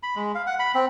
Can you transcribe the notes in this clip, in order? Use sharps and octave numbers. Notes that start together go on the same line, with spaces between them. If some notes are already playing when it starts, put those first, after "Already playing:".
B5
G#3
F5
F#5
B5
C4